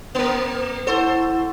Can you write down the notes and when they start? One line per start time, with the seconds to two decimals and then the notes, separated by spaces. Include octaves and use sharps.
0.15 A#3 A#4
0.87 E4 A4 C5 F#5 C#6